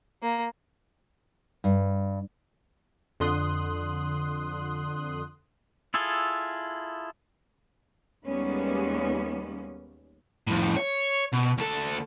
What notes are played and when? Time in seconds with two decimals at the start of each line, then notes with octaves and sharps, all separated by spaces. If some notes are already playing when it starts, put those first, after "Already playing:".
0.22 A#3
1.64 G2
3.20 F2 D3 C6 D#6 F#6
5.94 E4 F4 G#4 A4
8.25 D#2 G3 G#3 A#3 B3 C#4
10.47 F2 A2
10.76 C#5
11.33 B2
11.58 D2 A4